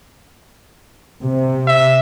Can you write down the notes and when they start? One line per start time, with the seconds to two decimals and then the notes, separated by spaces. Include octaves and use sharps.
1.25 C3
1.67 E5